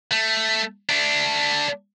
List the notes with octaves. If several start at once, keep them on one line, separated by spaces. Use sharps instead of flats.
A3
A3 D4